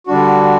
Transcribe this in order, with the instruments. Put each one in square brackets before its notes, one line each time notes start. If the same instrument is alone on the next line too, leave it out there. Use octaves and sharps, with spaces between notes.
[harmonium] D3 G3 D4 F#4